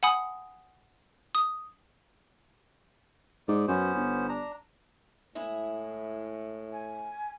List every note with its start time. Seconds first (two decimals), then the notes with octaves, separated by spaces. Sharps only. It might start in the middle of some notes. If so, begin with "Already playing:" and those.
0.03 F#5 G#5 B5 D#6
1.35 D#6
3.48 G#2 D#4 D5
3.68 F#2 B3 C#4 C5
3.95 G1
4.29 D4 A#5
5.35 A2 G#3 E4 G#4
6.72 G#5